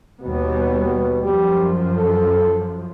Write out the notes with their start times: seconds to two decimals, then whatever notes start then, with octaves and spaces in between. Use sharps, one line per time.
0.22 D#2 B2 G3 B3
1.23 F#2 F3 G3
1.96 A4